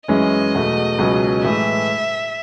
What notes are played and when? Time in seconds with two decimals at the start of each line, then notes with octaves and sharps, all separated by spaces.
0.08 F#2 E3 G#3 C#4 D#5
0.54 E2 B2 A3
0.98 C#2 B2 F#3 C#4
1.44 A2 E3 G#3 E5